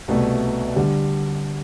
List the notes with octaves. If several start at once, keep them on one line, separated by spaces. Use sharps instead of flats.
C2 B2 A3
D3 G3